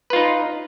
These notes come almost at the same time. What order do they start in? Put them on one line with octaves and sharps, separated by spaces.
B4 F4 D#4